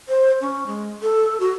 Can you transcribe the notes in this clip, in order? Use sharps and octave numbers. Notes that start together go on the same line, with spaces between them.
C5
C#4
G#3
A4
F#4